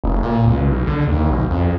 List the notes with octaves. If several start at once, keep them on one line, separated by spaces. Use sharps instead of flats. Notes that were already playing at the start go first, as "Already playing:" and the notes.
F1
A#2
C#2
B1
D3
D#2
B1
F2